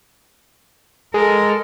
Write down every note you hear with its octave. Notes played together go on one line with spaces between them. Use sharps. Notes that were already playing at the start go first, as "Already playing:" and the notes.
G#3 A4 A#4